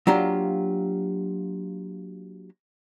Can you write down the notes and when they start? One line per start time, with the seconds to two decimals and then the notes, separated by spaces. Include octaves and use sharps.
0.07 F#3 A#3 D4 F4 G4 A#5